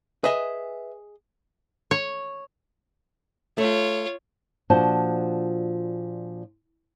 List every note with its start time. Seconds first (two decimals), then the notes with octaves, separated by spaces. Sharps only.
0.24 G#4 B4 D#5 E5 G#5
1.91 C#5
3.58 A3 F4 C#5
4.70 A#2 F3 D4 F#4 C5 A5